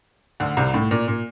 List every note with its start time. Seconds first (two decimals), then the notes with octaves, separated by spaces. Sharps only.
0.40 D2 D3
0.57 C2 C3
0.74 A2
0.91 A#2
1.08 A#2